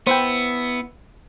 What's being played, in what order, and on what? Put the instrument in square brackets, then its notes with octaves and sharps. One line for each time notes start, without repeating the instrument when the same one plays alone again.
[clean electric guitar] B3 E4 [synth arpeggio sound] C5 G5